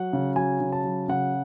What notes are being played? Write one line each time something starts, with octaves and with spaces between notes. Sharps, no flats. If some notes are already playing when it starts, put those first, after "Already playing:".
Already playing: F#3 F#5
C#3
F#3 G#5
C#3
A5
F#3
C#3 F#5